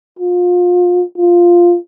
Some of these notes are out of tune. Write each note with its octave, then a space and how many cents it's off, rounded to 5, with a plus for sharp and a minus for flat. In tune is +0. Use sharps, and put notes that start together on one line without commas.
F4 +30
F4 +0